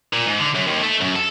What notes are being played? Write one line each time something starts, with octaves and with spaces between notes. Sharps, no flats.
A#2
G#2
D3
F#2
D#2
A3
F#2
A4